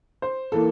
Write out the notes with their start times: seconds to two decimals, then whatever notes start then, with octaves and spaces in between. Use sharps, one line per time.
0.22 C5
0.52 E3 A#3 A4